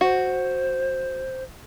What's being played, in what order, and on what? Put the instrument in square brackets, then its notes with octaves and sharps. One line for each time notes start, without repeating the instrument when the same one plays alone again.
[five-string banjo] F#4 [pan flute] C5